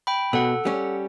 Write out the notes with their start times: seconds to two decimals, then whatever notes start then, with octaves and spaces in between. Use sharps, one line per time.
0.07 G5 B5
0.33 B2 A4 F#5
0.65 G3 C#4